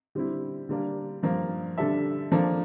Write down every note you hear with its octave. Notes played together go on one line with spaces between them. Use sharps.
D3 G3 C4 E4
D3 G3 A#3 D4
G2 F3 A#3
D3 G3 D4 A4 E5
F3 A#3 D4 A4